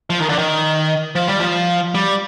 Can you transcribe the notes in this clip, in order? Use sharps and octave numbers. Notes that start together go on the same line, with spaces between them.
F3
D#3
D3
D#3
F3
G3
F3
G3